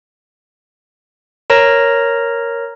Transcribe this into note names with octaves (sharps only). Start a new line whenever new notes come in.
A#4 C#5 A#5 A#6